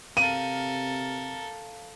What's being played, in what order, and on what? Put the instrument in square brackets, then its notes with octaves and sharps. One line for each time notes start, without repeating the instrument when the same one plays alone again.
[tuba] C3 [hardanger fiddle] A4 A#4 [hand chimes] F5 [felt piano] D#7